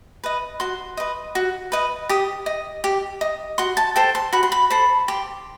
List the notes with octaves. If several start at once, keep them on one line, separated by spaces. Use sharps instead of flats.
B4 D#5
F#4 C6
B4 D#5
F#4
B4 D#5
G4 D#6
D#5
G4
D#5
F#4 C6
A5
A4 C5 G5
C6
F#4 B5
C6
B5
A4 C5 B5
G4 C6